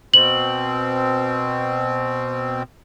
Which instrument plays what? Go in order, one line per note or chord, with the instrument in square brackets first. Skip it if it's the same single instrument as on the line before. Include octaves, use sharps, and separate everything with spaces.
[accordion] B2 C4 [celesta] F#7